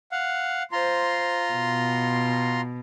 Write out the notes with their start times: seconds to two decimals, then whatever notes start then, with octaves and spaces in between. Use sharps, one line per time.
0.12 F5 F#5
0.72 F4 C5 A#5 C6
1.54 B2